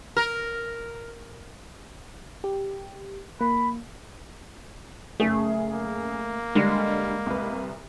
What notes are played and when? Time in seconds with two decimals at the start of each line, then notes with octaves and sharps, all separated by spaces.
0.17 A#4
2.44 G4
3.41 A#3 B5
5.20 F#1 C#3 A3 G#4
5.71 A#3
6.55 D3 G3 G#3 C7
7.26 C2 B4